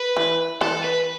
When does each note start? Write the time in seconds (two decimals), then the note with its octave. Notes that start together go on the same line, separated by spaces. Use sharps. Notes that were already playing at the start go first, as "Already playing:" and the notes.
Already playing: B4
0.17 E3
0.61 E3 A4
0.84 B4